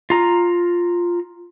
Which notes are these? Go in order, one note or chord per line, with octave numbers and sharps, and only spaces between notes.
F4 A#5